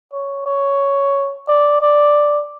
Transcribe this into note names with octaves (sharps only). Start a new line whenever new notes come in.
C#5
C#5
D5
D5